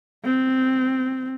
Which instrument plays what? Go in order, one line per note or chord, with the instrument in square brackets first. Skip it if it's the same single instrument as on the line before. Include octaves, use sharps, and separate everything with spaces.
[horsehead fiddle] C4